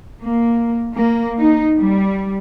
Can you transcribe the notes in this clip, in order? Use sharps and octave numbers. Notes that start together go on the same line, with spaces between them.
A#3
A#3
D#4
G3